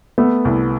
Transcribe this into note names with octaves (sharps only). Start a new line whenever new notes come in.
A3 B3
C2